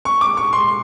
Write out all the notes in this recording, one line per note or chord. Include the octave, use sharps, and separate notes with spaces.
C#6
D6
C#6
C6